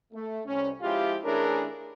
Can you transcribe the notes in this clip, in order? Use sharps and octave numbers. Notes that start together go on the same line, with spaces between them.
A3
C2 C#4
F3 G#3 E4 F4 G4
E3 A3 C#4 D4 G#4 A#4